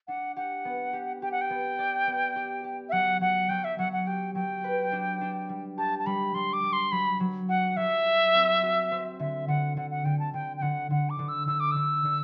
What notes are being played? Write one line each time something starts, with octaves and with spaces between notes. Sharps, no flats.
D4 F#5
G4 F#5
B3
G4
G4 G5
F#5
G5
B3
D5
B3
G4
G4
E5
F#3 F#5
F#3 F#5
F#3 G5
E5
F#3 F#5
F#5
G4 G5
F#3 G5
B4
D4
D4
G3
G4 A5
A5
G3 B5
G3 C6
D6
G3
C6
F#3 B5
F#3
F#4 F#5
F#3 E5
F#4
C4
F#4
C4
D3 E5
D3 F#5
D3 F#5
F#5
D3 G5
A5
D3 G5
G5
D3 F#5
D3 F#5
D6
D3
E6
D3 E6
D6
D3 E6
D3